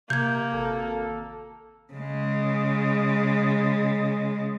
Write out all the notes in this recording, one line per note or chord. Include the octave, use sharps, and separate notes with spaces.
C3 A#3 G6 G#6
G#1 A4
C#3 G#3